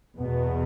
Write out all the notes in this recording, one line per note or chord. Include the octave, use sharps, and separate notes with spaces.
E2 B2 B3